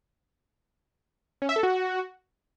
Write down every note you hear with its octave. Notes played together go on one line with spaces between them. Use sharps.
C#4
E5
A4
F#4